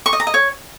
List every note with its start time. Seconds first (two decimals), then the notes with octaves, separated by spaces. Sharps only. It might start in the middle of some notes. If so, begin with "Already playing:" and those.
0.06 C#6
0.13 D#5
0.20 A#5
0.27 D#5
0.34 C#5